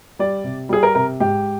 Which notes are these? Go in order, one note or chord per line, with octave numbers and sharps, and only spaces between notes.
G3 D5
C3
G3 G#4
A#4
C3 A#4
G#2 G4